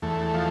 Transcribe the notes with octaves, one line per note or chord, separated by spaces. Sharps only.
E2 A3
F3